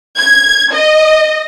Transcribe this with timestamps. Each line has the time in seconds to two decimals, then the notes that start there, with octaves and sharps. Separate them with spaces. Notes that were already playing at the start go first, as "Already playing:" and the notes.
0.17 G#6
0.72 D#5